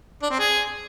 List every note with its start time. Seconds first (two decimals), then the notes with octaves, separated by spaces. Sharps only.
0.22 D4
0.31 C4
0.39 G#4